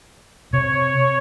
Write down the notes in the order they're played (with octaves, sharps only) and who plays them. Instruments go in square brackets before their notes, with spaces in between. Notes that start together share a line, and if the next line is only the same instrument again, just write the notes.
[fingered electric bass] C3 [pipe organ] C#5